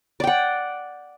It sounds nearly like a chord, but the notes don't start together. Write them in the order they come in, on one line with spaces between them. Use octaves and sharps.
D5 G5 F#5